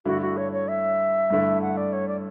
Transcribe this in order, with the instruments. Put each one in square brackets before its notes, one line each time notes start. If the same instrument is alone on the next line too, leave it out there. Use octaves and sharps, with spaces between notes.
[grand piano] G2 D3 A3 E4 [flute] F#4
[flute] F#4
C#5
C#5
E5
[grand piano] G2 D3 A3 E4
[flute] F#5
D5
C#5
D5